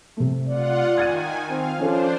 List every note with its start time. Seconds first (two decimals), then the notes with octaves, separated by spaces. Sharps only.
0.17 C3 A3
0.48 F4 D5 F#5
0.98 D#3 G#5 G#6 A6 D#7
1.50 C4 F5 F6
1.79 F3 C#4 D4 A4 C5